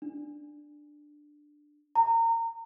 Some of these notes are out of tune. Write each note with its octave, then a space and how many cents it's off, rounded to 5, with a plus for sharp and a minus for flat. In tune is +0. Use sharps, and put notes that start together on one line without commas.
D4 +10
A#5 -25